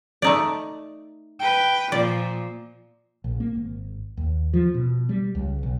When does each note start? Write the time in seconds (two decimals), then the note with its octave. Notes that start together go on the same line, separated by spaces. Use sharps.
0.22 A3 D#4 D5
1.39 B4 G5
1.92 A#2 F3 D5
3.24 A#1
3.40 A#3
3.55 G#1
4.17 D#2
4.53 F3
4.74 B2
5.09 G3
5.35 C#2
5.63 B1